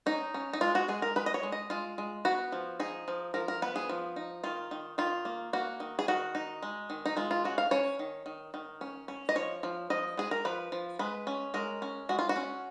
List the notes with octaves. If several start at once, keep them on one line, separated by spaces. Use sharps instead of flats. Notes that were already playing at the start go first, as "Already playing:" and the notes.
C#4 D#4
C#4
D#4
G#3 F4
F#4
G#3 G#4
A#4
G#3 B4
D#5
C#5
G#3
D#5
G#3 F4
G#3
B3 F#4
F3
D#4 G#4
F3
F3 A#4
A#4
B3 B4
G#4
F3
D#4
D#3 F4
D#3
D#3 F4
A#3
A#3 F#4
D#3
G#4
D#3 F#4
D#4
G#3
D#3
D#4
G#3 F4
F4
C#4 F#4
F5
C#4 C#5
D#3
D#3
D#3
C#4
C#4
D#5
F3 C#5
F3
F3 D#5
G#3 G#4
A#4
F3 B4
F3
G#3 B4
C#4
G#3 A#4
C#4
G#3 F#4
F4
F#4
C#4